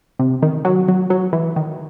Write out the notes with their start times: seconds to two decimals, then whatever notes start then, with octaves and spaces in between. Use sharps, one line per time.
0.19 C3
0.42 D#3
0.65 F#3
0.88 F#3
1.10 F#3
1.33 E3
1.56 D#3